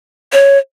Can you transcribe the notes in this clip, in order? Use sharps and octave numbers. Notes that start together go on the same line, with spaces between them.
C#5